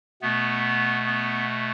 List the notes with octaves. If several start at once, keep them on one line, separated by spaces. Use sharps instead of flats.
B2 A3 B3
B3